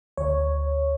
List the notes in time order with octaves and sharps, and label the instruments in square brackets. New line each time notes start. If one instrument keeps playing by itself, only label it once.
[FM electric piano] D2 C#5